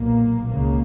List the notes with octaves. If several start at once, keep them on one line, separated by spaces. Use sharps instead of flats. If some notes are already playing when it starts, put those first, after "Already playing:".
Already playing: B1 A#2 A#3
C#2 C#3 A#3